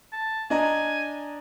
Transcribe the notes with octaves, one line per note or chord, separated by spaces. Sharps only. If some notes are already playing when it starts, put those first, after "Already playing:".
A5
D4 D#5 G#5 A#5